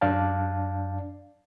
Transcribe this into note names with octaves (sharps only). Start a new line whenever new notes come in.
F#2 D4 D5 F5 A5